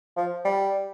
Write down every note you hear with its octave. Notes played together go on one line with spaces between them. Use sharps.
F3
G3